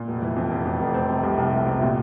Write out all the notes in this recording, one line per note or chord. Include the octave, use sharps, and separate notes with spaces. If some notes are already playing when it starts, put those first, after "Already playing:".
Already playing: A#2
F1
E3
F2
F1
F2
F1
C4
C3
C2
C2
C2
C3
A#2